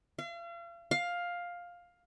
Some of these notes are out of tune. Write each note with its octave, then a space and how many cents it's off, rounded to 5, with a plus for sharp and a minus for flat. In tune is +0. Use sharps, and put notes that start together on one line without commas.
F5 -40
F5 +10